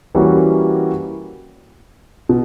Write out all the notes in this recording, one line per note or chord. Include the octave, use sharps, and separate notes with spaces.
E3 G3 A#3 C#4 F#4
B2